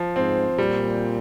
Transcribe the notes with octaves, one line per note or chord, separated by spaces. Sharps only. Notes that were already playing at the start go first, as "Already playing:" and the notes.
Already playing: F3
G#2 C4
A#2 G3